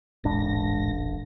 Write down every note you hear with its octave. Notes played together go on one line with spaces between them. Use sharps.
D#1 A1 G#2 D4 A#6